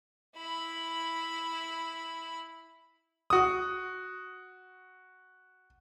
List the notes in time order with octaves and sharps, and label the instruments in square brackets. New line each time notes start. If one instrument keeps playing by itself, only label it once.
[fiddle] E4 B5
[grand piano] F#4 D#6